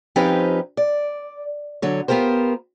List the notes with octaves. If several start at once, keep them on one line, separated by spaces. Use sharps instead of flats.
F3 C4 C#4 D#4 G4 B4
D5
D3 F#3 C#5
B3 F4 G4 A#4 C5